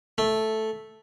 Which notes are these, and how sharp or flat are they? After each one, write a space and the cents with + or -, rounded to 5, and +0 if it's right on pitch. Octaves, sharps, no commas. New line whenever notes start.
A3 -5